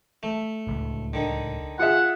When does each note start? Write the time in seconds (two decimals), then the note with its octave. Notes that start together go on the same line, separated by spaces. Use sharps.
0.23 A3
0.67 D1 C#2
1.13 D3 D#3
1.79 F4 G#4 E5 F#5